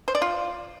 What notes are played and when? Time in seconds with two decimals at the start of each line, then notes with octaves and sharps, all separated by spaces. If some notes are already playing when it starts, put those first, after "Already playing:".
0.08 C5
0.15 D5
0.22 F4